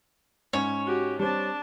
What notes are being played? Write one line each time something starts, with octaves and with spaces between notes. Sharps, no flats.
G#2 C#4 C#5
F#4 G4
G3 C4 D4 A5